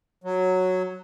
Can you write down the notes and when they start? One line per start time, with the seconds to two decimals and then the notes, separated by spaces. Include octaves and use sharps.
0.24 F#3